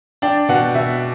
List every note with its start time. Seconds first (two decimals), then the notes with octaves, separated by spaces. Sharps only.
0.22 D4 G5
0.49 B2 F#5
0.75 B2 E5